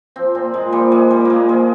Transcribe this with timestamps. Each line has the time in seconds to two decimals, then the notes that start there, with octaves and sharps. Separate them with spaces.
0.16 F3 C4
0.35 A#2 C4
0.54 A#2 G#3
0.72 F3 G3
0.91 F3 G#3
1.10 A#2 G3
1.25 A#2 G#3 A#3
1.49 F3 G#3